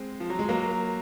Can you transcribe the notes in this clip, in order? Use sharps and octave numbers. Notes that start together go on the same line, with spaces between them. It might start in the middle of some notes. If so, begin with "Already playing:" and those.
Already playing: G#3 C4
F3
F#3
G#3
F#3 A#3